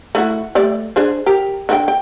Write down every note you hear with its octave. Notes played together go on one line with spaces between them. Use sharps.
A3 E4 F#4
G3 A3 D5
D4 G#4 C5
G4 A#4
D3 F#4 G5
G5